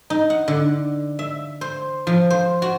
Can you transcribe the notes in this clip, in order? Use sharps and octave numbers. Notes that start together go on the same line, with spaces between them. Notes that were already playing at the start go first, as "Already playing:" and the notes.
D#4
F#5
D3
E5
C5
F3
C5
F#4